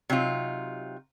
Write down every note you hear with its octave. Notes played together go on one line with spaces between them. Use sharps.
C3 F#3 D#4 F4